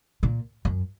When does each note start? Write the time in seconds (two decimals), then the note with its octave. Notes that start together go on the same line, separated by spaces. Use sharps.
0.23 A#2
0.65 F#2